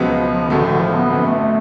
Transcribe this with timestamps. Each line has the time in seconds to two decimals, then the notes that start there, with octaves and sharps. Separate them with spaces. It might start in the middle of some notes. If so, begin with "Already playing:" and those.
Already playing: C#2 B2 F3 F#3 B3
0.50 A1 A2 D3 F#3 A3
0.65 D3
0.80 F3
0.96 B3
1.10 G#1 F#2 D3 B3
1.25 A3